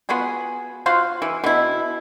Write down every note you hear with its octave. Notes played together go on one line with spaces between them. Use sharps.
B3 F4 F#4 G#4
F4 F#4 C5 F5
E3
B2 E4